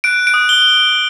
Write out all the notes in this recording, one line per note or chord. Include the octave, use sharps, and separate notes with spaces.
F#6 D7
D7
D#6
G7